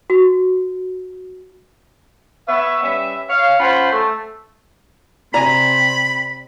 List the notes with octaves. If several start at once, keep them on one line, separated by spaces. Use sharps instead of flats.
F#4
B3 B4 C#5 E5
G3 C#4 B4 E5
C#5 F5
C#4 F4 C5 F#5 B5
A3
C3 D5 G#5 A#5 B5